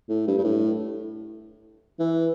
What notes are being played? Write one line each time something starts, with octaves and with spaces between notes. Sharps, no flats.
A2
G2
G2
A2
E3